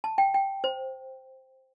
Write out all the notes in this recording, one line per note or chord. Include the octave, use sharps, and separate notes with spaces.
A5
G5
G5
C5